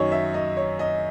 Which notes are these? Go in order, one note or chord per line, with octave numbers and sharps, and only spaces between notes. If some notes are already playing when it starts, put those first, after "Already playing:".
Already playing: F#2 D#3 F#3 C#5 D#5
E5
D#5
C#5
D#5